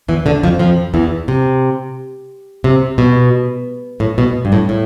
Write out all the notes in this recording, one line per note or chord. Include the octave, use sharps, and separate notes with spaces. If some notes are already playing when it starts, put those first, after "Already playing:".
E2 E3
D2 D3
F2 F3
F2 F3
E2 E3
C3
C3
B2
A2
B2
G2
A2
A2